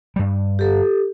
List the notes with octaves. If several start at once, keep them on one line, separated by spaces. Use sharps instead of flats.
G2 G3
G4 A4